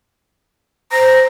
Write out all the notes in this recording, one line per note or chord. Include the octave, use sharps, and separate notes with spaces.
C5 A#5